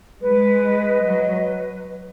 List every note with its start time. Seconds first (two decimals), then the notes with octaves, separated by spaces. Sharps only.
0.22 G#3 B4
0.64 D#5
1.05 F#3 B4